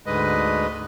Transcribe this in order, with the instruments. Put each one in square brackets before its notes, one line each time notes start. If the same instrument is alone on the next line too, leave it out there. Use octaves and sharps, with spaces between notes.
[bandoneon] D2 G#2 D3 G#3 B4 D#5